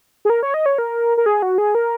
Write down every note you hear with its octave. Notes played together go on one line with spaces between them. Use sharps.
G#4
A#4
C#5
D#5
C#5
A#4
A#4
G#4
F#4
G#4
A#4